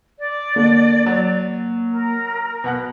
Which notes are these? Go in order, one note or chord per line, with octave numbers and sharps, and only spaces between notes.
D5
D3 A#3
F#3
A#4
B2 F#5 F#6